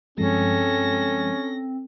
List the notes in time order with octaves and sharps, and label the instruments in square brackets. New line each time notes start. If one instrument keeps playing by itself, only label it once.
[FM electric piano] G2 F3 G#3 [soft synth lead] C4 [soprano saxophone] C#4 [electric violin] A4 A#6